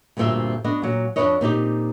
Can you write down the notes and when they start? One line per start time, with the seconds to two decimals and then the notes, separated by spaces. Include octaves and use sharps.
0.17 D2 G2 A#2 C4 F4 E5
0.64 B3 D4 F#4 D#5
0.82 A#2 F#3
1.16 F2 D#3 D4 B4 C#5 D#5
1.41 A#2 C4 D#4 G4